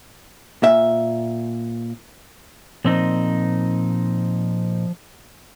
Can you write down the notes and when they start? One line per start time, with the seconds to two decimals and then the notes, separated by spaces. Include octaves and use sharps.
0.63 A#2 E5
2.85 A#2 F3 C4 D#4